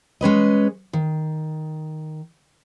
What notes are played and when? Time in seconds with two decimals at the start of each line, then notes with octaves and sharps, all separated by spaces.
0.21 G#3 C#4 B4 D#5
0.93 D#3